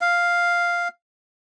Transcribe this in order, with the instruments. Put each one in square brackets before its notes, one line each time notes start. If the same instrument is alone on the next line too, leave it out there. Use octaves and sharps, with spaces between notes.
[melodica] F5